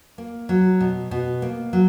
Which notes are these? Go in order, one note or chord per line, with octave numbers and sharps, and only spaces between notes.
A#3
F#3
B2
B2
A#3
F#3